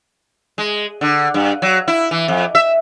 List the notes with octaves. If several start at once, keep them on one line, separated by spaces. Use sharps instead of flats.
G#3
D3
G2
F#3
E4
E3
F2
E5